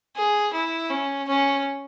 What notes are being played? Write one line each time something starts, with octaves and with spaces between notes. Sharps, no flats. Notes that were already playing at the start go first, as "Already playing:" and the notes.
G#4
E4
C#4
C#4